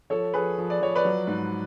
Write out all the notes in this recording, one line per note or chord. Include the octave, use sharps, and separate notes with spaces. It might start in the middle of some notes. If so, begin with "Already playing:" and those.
F3 A4 C#5
F3 G#4 B4
F3
D5
F3 C#5
B4 D5
F#3
G#2